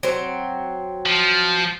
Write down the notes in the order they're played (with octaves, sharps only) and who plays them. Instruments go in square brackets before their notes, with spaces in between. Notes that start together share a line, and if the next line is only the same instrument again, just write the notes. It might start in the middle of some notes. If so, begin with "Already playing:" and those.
[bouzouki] F#3 C4
[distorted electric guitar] F3